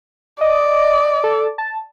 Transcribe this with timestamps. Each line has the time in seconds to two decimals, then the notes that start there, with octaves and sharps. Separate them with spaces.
0.41 D5 D#5
1.24 A4
1.58 A5